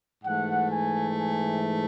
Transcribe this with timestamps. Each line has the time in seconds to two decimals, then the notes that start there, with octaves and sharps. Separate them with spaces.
0.24 G#2 E3 A3 F#5
0.70 G#5
1.17 G#5